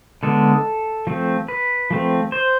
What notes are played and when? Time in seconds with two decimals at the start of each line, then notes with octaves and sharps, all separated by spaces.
0.23 D3 G#3 B3 A4
1.07 F3 A3 C4
1.48 B4
1.91 F3 A3 C4
2.32 C5